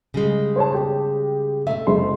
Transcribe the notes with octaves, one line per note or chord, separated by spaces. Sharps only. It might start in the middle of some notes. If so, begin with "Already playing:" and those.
C#3 G3 G#3
C5 C#5 A5
G4
C3 A3 E5
F#1 G#3 C6